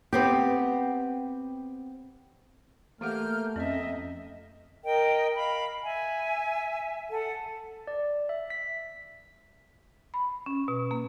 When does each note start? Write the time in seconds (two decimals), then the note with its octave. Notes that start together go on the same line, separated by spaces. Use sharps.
0.13 B3 C4 G4
3.01 E3 A3 A#3 G4 F#5 F6 G6
3.56 F2 C4 C#4 D#5 E5
4.84 A#4 D#5 G5
5.36 F5 B5
5.84 E5 G#5
7.10 A4 F#5
7.87 D5
8.29 E5
8.50 B6
10.14 B5
10.46 C#4
10.68 B2
10.91 A#3